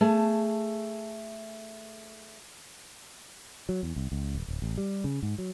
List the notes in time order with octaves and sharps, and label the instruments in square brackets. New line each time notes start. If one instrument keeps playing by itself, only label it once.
[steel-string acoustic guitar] A3 G#4 A5
[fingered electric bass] F#3
E2
C2
C#2
D#1
D1
A1
G3
C#3
G#2
F#3